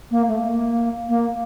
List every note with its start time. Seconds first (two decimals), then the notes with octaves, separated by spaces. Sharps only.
0.11 A#3
0.28 A3
0.43 A#3
1.09 A#3